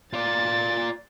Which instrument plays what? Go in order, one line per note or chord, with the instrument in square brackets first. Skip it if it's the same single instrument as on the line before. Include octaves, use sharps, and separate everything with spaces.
[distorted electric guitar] F4 D5 [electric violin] A6